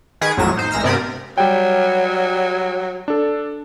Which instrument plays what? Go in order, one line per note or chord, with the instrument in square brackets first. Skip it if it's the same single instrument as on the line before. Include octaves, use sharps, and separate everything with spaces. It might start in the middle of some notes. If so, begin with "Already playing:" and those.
[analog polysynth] D#3 G#4 B4 C#6 D#6 D7
A1 F2 A2 F#3 A#6 E7
D#4 C5
A1 G#3 A#5 E6 F6 A#6
G2 C3 B3 A#4 D5 D#6
[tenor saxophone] F#3 [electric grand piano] G3 G5
[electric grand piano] D4 A4